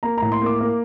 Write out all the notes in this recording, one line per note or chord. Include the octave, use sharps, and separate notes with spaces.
A#3 A#5
A2 A#5
C6
A#3 D6
A#3